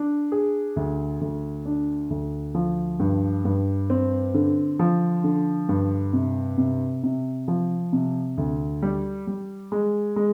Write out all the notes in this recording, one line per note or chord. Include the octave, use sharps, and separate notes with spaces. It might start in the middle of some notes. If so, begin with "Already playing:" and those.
Already playing: D4
G#4
D2
D2
D4
D2
F3
G2
G2
C4
D3
F3
D3
G2
C3
C3
C3
F3
C3
D2
G3
G3
G#3
G#3